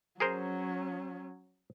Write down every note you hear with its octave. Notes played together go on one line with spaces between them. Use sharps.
F#3 C#4 G#4 A#4 C5